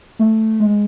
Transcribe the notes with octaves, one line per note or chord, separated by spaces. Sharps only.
A3
G#3